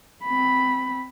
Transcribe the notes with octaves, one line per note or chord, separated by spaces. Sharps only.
C4 B5